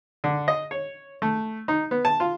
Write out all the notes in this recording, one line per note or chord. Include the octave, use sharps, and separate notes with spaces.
D3
D#5
C#5
A3
D#4
B3
A5
F4